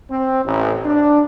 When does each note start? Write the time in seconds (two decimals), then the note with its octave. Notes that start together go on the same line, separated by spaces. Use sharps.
0.10 C4
0.45 A1
0.84 D4